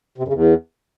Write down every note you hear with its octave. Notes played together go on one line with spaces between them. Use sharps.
C3
F#2
C#3
E2